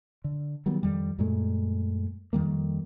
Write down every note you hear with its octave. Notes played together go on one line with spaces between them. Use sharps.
D3
D#3 F#3 G3 B3
F2 D#3 G3
F#2 A#2 G#3 A3
F2 D#3 G3 A#3